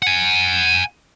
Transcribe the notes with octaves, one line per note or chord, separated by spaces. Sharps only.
F#5 G#5